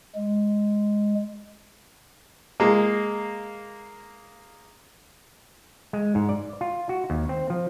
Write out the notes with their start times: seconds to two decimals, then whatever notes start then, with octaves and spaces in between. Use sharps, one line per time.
0.15 G#3
2.60 G#3 A#3
5.93 G#3
6.15 G#2
6.29 D5
6.61 F4
6.89 F#4
7.10 D#2
7.29 C4
7.50 F3